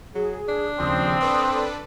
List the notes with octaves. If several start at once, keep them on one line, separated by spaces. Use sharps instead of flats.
F#3 G#4
D4
D#2 C#3 F3 C4 C6 D#6
D4 A4 B4 D5